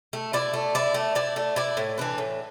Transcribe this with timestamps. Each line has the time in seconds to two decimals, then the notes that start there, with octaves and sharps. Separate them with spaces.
0.13 A3
0.33 E4 D5
0.54 A3
0.75 E4 D5
0.94 A3
1.15 E4 D5
1.36 A3
1.56 E4 D5
1.77 A2
1.98 E3 D4 B4
2.18 A2